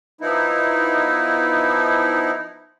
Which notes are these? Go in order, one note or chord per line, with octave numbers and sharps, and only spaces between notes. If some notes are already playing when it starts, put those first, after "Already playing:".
F3 B3 D#4 E4